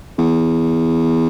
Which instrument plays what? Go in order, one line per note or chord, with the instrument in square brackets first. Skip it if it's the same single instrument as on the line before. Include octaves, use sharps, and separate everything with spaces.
[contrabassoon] E2